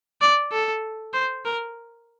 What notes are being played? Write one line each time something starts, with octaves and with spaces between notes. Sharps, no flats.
D5
A4
C5
A#4